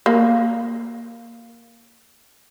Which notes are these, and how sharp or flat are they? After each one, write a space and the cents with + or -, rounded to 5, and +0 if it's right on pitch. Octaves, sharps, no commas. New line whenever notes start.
A#3 +0